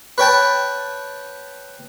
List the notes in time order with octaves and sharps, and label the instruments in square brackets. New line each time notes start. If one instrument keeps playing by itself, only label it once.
[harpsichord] B4 C#5 G5 A5